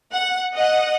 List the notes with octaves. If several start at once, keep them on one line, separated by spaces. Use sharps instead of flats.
F#5
D#5 F#5